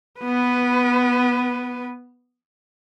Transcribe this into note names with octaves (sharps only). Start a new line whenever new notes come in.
B3 B4